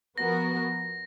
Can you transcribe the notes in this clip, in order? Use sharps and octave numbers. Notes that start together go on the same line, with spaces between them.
F3 B3 F#4 A#4 A#6